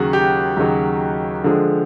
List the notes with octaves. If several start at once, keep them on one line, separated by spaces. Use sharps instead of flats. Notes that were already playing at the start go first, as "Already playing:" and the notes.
Already playing: D#2 C#3 F#3 F#4
G4
D#2 C#3 F#3
D3 F3 G#3